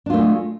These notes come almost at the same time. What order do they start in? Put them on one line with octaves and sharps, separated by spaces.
D4 F4 A3 G#3